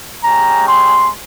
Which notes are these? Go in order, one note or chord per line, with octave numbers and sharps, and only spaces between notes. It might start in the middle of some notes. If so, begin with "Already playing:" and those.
G#3 C#4 G4 A#5
C6